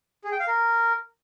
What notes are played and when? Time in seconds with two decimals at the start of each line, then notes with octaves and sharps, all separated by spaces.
0.24 G#4
0.32 G5
0.40 F5
0.48 A#4